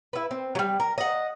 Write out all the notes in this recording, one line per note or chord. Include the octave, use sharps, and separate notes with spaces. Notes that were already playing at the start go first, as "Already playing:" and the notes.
E4 B4
C4
F#3 G3
A#4
D#5 F#5